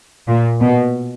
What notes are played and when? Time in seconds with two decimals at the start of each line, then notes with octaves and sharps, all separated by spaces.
0.28 A#2
0.61 B2